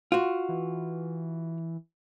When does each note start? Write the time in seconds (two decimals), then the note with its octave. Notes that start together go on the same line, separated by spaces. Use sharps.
0.12 F4 F#4
0.49 E3